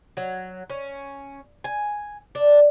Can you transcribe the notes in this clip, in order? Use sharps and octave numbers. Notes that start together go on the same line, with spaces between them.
F#3
C#4
G#5
D4